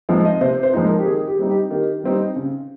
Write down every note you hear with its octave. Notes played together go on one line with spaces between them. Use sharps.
F3 G#3 C4 D#4
D#5
C3 C5
C5
F3 G#3 C4 D#4
A#4
G4
D#3 G#4
G4
G3 C4 D#4
G4
D#3 G4
G3 C4 D#4
C#3